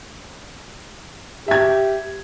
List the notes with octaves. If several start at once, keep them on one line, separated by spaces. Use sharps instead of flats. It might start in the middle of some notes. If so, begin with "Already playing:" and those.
G4 E5 G#6